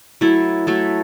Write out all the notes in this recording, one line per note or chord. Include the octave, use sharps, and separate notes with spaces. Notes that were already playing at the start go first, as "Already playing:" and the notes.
F#3 A3 E4 A4
F#3 A3 E4 A4